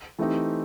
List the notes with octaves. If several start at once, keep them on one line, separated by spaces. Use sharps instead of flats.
E3 A3 C4 D#4 G4